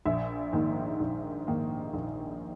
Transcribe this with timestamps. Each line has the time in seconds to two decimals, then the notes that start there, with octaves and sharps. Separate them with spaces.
0.05 A#1 E5
0.53 G#2 D#3 A#3
1.00 A#1
1.47 G#2 D#3 A#3
1.94 A#1